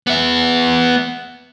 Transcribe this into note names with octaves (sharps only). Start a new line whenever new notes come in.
B3 E5